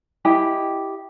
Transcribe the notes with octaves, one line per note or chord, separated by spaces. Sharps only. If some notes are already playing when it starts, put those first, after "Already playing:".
E4 G4 D#5